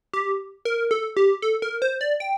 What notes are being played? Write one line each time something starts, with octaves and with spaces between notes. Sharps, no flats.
G4
A#4
A4
G4
A4
A#4
C5
D5
G5